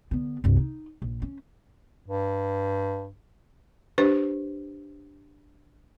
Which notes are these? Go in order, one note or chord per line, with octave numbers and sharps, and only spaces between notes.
D3 B3
C2 G2
D#4
A#1
C#4
G2
D4 G4 B4 C5